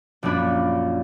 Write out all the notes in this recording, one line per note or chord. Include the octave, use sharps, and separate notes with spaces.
A#1 F#2 A#3 D4 B5